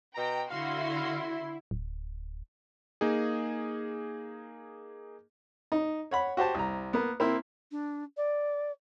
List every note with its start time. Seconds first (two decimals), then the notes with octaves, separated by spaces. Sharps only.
0.15 B2 G5 A#5
0.50 D3 E4 F#4 F5 C6
1.71 D1
3.01 A#3 D#4 G#4
5.72 D#4
6.11 C#5 F#5 B5
6.37 F#4 G4 C5 A5
6.55 C2 A#5
6.93 A#3 B3
7.20 A#3 C4 E4
7.72 D4
8.17 D5